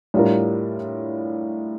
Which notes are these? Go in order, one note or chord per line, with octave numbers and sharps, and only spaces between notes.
A2 G3 D4 F4 A#4